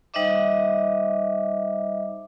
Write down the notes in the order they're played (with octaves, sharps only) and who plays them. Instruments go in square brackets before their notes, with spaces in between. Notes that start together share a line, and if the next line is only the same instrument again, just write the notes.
[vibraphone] G3 D#4 C5 D#5 E5 D6